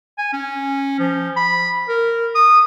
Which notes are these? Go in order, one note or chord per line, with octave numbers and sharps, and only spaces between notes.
G#5
C#4
F3
B5
A#4
D#6